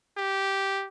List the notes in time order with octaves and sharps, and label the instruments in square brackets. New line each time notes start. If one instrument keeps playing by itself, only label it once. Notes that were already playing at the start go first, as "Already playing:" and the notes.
[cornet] G4